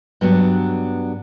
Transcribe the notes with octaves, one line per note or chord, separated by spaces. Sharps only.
G2 F#3 B3 D4